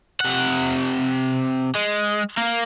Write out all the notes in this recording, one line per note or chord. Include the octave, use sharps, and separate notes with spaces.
C3 F#5
G#3
A#3